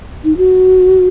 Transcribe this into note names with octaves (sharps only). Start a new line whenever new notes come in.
D#4
F#4